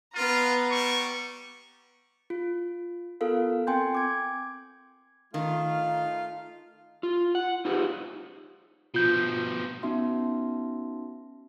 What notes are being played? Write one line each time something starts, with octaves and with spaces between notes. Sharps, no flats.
B3 F4 A#5
G3 C#6
F4
B3 F4 A4 A#4 F5
C4 G5 G#5 C6 G6
D6 G#6
D#3 A3 D#4 F4 F5
F4
F#5
D#4 F4 G4 G#4 B4 C5
B2 F3 F4 G6
B3 C#4 D#4 F#4 E5 C6